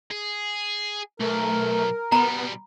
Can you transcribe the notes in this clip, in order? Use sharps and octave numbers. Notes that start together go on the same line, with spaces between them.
G#4
B1 A3 A#4
B2 G3 B3 A#5 B5